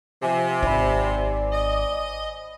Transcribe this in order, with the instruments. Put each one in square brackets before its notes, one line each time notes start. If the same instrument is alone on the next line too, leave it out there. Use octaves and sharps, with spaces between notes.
[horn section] C3 [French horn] F3 [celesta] G#5
[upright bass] G#1 D#4 [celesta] C5 G#5 B5 [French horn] D5
[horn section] D#5